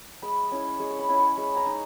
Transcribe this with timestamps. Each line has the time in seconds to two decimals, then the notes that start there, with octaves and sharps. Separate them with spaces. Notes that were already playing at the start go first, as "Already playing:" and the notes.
0.22 G#3 B5
0.51 C#4 E4
0.80 G#3 C#6
0.91 C#6
0.99 B5
1.09 C#4 E4
1.19 C#6
1.37 G#3 B5
1.57 A#5
1.66 D#4